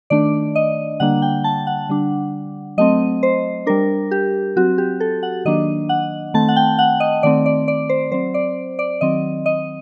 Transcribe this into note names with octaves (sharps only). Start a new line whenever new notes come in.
D#3 A3 D4 D5
D#5
D3 G3 A#3 D4 F#5
G5
A5
F#5
D3 G3 D4
F#3 A3 C4 D#5
C5
G3 D4 A#4
G4
F#3 C4 F#4
G4
A4
F#5
D#3 F#3 A#3 D4 D#5
F#5
D#3 A3 C4 A5
F#5
G5
F#5
D#5
D#3 A3 C4 D5
D5
D5
C5
F#3 C4 C5
D5
D5
D#3 F#3 C4 D#5
D#5